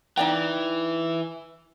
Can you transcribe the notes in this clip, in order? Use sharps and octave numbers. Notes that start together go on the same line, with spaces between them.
E3 D#4 D5 G5